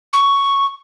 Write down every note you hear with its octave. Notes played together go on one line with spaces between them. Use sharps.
C#6